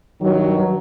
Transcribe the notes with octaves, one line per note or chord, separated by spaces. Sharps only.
G2 D#3 F#3